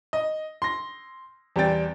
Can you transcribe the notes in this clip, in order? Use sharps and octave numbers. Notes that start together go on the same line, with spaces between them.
D#5
C6 A#6
E2 G3 C4 G5 A6